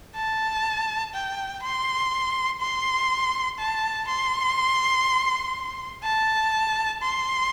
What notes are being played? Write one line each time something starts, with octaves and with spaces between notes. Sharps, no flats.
A5
G5
C6
C6
A5
C6
A5
C6